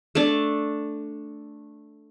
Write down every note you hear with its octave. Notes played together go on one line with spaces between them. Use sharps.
A3 D4